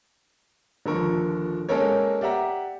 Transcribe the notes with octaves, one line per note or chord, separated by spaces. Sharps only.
D#1 D3 F3 A4 A#4 C#6
G#3 A#3 C#4 A4 A#4 C#5
G4 D5 E5 F#5 A#5